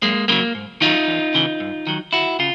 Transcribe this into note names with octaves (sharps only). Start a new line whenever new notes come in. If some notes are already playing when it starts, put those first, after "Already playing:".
F#2 G#3 A#3
C#3 F#3 G#3 A#3
G#2
D#3 F#3 D#4 F4
E2
C#3 E3
G2
D#3 F#3
D2 E4 F#4
C#3 F4